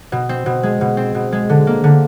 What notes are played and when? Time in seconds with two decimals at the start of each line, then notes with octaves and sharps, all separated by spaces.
0.12 B2
0.29 C4
0.46 B2
0.63 G#3
0.81 B2
0.97 C4
1.15 B2
1.32 G#3
1.49 D3
1.67 A#3
1.84 D3